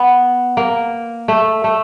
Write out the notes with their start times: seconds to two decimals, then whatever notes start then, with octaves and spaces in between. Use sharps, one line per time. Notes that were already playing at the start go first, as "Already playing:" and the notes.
Already playing: B3
0.57 A#3
1.28 A3
1.64 A3